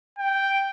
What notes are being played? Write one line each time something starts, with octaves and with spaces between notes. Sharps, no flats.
G5